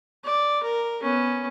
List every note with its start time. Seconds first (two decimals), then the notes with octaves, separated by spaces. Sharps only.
0.25 D5
0.63 A#4
1.02 B3 C#4